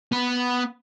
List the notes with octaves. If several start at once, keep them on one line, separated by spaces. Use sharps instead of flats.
B3 B5